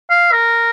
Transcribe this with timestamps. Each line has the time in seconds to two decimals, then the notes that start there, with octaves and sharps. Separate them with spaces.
0.10 F5
0.32 A#4